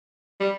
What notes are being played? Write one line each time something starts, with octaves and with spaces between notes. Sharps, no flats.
G3